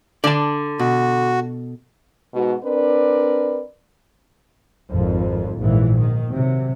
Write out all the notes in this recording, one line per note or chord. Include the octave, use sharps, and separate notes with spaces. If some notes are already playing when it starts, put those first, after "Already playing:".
D3 D5 A5
B2 F#4
G#2 B2 F#4
C4 D4 A#4 B4 D5
G#1 F2
A#1 G#2 E3
D#3
C3 F#3